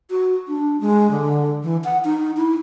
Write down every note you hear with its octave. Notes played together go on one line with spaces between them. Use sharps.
F#4
D4
G#3
D3
E3
F#5
D#4
E4